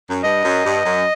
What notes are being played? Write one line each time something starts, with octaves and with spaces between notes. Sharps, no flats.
F#2
G2 D#5
F#2
G2
F#2